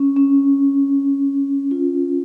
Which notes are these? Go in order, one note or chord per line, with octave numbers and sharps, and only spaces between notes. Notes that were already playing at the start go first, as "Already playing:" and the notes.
Already playing: C#4
C#4
F4